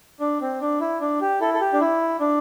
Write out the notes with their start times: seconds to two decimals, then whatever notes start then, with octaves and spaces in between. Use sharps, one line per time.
0.20 D4
0.41 C4
0.61 D4
0.80 E4
1.01 D4
1.21 G4
1.41 E4 A4
1.54 A4
1.61 G4
1.73 D4
1.81 E4
2.20 D4